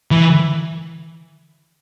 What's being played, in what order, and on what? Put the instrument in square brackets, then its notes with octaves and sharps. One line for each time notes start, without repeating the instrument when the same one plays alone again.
[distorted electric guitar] E3